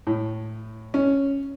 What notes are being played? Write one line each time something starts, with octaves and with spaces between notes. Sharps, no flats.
A2
C#4